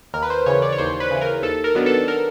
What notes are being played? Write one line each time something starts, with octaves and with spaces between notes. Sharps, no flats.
D#2 A#4
B4
C5
C#3 E3 C#5
D5
C#5
D#2 C5
B4
C#3 E3
A#4
D#2 A4
A#4
D#3 F#3 B3 D4
A4
A#4